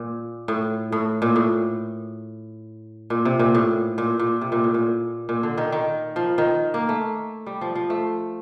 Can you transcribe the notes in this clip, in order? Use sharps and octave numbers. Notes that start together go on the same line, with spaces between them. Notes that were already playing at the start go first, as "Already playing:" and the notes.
Already playing: A#2
A2
A2
A#2
A2
A#2
C3
A#2
A2
A#2
A#2
C3
A#2
A2
A#2
A#2
D3
D#3
D#3
F3
D#3
A#3
A3
G3
F3
F3
A3